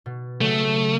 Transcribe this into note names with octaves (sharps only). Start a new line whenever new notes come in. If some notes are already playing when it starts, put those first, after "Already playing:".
B2
C#3 F#3 A3